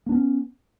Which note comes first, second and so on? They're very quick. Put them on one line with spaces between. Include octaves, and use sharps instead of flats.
A#3 D4 B3 C#4